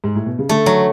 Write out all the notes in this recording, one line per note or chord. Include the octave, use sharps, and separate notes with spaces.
G#2
A2
B2
C#3
D3 A3
F#3